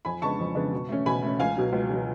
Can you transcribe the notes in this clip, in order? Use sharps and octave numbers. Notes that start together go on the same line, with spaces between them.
F2 G#5 B5
C#3 G#3 B3 D4 A5 C#6
F2
C#3 G#3 B3 D4
B2
A3 C#4
B2 G#5 B5
A3 C#4
C#2 F5 G#5
B2 F#3
C#2
B2 F#3